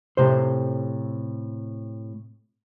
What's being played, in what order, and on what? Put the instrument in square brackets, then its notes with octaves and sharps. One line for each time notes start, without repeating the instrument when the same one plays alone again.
[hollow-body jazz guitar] A2 C3 C5